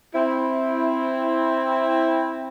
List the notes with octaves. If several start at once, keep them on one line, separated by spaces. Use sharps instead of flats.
C4 E4